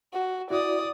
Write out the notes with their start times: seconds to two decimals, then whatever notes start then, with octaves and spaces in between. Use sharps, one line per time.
0.13 F#4
0.50 E4 F#4 D5 D#6